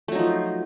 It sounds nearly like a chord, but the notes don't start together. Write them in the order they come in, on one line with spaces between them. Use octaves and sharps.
A3 F#3 D#4 F3